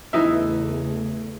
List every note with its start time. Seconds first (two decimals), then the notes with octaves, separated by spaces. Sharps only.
0.13 E2 C#3 E3 A3 D#4 E5